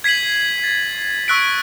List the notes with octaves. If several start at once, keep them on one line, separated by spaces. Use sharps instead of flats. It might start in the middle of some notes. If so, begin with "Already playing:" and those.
G#6 B6 C7 D#7 F#7
A6
C#6 E6 F#6 B6 D7